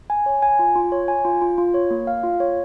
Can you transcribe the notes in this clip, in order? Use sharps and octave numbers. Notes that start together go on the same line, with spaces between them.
G#5
C#5
G#5
F4
F4
C#5
G#5
F4
F4
F4
C#5
A#3
F5
F4
C#5